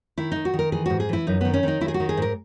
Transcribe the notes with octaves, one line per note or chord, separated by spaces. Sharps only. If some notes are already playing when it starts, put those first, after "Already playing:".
D#3 E4
D#3 D#4
F#4
D#3
A#4
E3 G#4
G#2 F#4
G#4
E3 E4
F#2 D#4
D#3 B3
C#4
D#3 D#4
D#3 E4
G#4
F#4
D#3
G#4
G#2 A#4